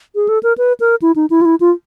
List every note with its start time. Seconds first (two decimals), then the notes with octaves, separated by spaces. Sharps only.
0.15 G#4
0.29 A4
0.43 A#4
0.58 B4
0.80 A#4
1.02 E4
1.16 D#4
1.30 E4
1.41 F4
1.45 E4
1.60 F4